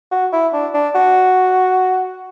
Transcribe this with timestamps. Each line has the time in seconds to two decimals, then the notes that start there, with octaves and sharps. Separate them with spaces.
0.11 F#4
0.33 E4
0.53 D4
0.74 D4
0.95 F#4